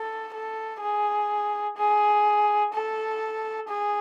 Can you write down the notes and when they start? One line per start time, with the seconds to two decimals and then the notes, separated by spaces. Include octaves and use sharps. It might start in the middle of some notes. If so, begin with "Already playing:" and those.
Already playing: A4
0.33 A4
0.81 G#4
1.77 G#4
2.73 A4
3.68 G#4